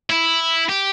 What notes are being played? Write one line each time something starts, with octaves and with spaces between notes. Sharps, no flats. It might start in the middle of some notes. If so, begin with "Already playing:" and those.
E4
G4